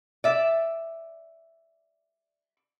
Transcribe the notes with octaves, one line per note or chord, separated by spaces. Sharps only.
D5 E5